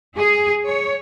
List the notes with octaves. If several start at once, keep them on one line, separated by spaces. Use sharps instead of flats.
G#4
C#5